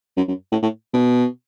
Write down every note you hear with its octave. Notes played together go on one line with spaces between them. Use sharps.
F#2
F#2
A2
A2
B2